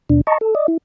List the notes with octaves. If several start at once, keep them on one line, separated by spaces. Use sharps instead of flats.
D#2 B2 D4
D#5 A5 A#5 C#6
A4
D5 D#5
E4